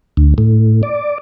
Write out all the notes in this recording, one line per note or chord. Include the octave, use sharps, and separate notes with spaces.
D2
A2
D5